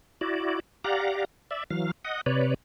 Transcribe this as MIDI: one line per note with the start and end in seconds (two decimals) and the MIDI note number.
0.21 0.60 64
0.21 0.60 66
0.21 0.60 74
0.84 1.25 67
0.84 1.25 74
0.84 1.25 77
0.84 1.25 78
0.84 1.25 82
1.51 1.64 74
1.51 1.64 76
1.70 1.91 52
1.70 1.91 54
1.70 1.91 77
2.05 2.21 75
2.05 2.21 78
2.26 2.54 48
2.26 2.54 71
2.26 2.54 73
2.26 2.54 74